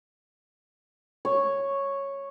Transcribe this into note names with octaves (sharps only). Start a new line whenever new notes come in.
C#5